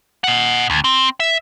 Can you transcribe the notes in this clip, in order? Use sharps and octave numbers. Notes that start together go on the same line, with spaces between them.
D#5 F#5
D2
C4
E5